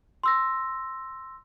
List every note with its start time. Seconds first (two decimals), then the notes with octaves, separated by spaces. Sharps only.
0.24 C6 E6 A#6